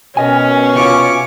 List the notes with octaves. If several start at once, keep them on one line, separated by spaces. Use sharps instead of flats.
B2 C#4 A#4 D#5 G#5
C3 E4 F4 C#6 D6